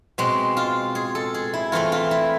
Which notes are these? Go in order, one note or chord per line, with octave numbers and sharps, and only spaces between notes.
B2 G#3 C4
F4
G#4
A4
G#4
E4
E3 A3 C4 F4
F4
E4